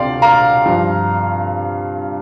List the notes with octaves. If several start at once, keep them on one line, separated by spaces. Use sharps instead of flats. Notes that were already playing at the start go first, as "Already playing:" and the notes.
Already playing: D2 C3 F3 D5 F5 G5 C6
F5 A#5
G2 F3